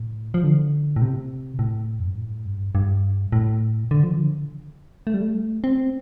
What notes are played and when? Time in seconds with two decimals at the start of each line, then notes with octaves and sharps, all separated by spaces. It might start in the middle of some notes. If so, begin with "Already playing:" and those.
Already playing: A2
0.34 F3
0.44 D3
0.96 A2
1.02 C3
1.59 A2
1.99 F2
2.08 G2
2.18 A2
2.46 G2
2.75 G2
3.32 A2
3.91 D3
4.03 F3
4.17 D3
5.07 A3
5.14 G3
5.22 A3
5.64 C4